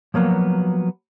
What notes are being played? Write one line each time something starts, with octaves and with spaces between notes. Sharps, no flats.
F3 F#3 A#3 B3